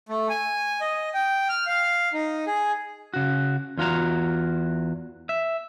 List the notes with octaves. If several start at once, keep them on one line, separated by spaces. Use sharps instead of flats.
A3
G#5
D#5
G5
F6
F5
D#4
G#4
C#3 F#4
E2 F4 F#4 A#5
E5